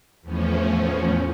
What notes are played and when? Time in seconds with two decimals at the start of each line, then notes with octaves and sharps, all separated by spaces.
0.22 E2 A2 F3 C#4